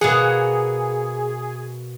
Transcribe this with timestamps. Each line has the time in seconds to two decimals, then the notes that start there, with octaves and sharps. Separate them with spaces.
0.01 B2 A#3 G#4 F#5